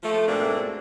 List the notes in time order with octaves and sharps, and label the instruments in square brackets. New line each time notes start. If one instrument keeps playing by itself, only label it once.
[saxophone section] F3 A3
G#2 B2 A3 A#3 C4 D4